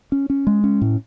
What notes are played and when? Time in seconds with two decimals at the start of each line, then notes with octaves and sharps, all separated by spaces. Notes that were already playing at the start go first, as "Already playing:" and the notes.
0.12 C#4
0.30 C#4
0.47 G#3
0.64 C#4
0.81 A2